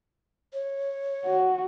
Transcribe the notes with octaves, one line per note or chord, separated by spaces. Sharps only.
C#5
F#4